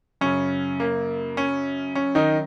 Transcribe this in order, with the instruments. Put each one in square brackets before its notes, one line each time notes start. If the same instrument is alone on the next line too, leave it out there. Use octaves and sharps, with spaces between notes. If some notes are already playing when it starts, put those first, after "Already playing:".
[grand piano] F#2 C#3 C#4
A#3
C#4
C#4
D#3 D#4